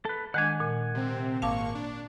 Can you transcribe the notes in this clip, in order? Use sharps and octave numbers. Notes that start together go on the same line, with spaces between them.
A4 B4
D#3 G#3 D4 F#5 G#5
A#2
C3 C4
G#1 A#3 F5 A5 C#6 D6
D4